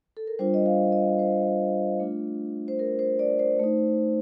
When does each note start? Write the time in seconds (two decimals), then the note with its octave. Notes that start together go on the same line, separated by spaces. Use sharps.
0.17 A4
0.27 A#4
0.39 G3 D4 F4 C5
0.54 D#5
0.66 F5
0.92 D#5
1.19 C5
2.00 A3 D4 F4
2.68 C5
2.79 A#4
2.99 C5
3.19 D5
3.39 C5
3.59 A3 D#4